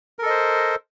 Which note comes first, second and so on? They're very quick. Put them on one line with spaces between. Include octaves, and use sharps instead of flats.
A#4 A4 D#5 C5